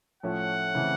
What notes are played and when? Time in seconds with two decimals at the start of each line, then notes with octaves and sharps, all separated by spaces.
0.23 A2 F3 A3 C#4 F#5
0.75 C#3 E3 A3 C4